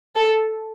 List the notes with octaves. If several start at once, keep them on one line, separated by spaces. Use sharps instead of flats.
A4